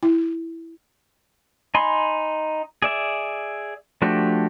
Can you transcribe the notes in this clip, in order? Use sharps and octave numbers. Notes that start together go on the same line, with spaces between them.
E4
D#4 G#5 B5 C6
G#4 D5 E5
F3 A3 D4 F#4 G4